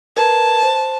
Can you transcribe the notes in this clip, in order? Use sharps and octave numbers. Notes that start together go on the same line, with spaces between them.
A#4 B4 A5 G#6
C5